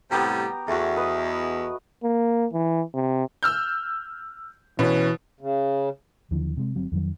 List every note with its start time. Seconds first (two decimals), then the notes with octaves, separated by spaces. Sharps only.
0.11 A2 C3 G3 B3 G4 A#5
0.68 E2 A3 F#4
0.96 B4 D#5
2.04 A#3
2.53 E3
2.94 C3
3.43 E6 F6 G6
4.79 B2 E3 C#4 B4
5.41 C#3
6.31 D#2 D3 E3 F3
6.57 C3 G#3
6.75 G1 F#3 C4
6.92 F2 D#3 F#3